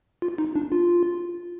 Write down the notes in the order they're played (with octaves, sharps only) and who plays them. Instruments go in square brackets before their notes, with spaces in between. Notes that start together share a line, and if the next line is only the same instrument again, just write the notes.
[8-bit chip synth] F4
D#4
D4
F4